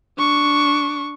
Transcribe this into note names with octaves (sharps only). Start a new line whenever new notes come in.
D4 C#6